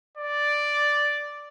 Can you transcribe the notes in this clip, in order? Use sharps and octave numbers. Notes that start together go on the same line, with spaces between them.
D5